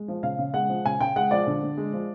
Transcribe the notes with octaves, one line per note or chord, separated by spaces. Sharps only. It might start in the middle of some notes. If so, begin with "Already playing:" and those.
Already playing: G#3
F3
C#3 F5
C#3
G#3 F#5
F3
C#3 G#5
C#3 G5
G#3 F#5
F3 D5
D3
D3
G#3
F3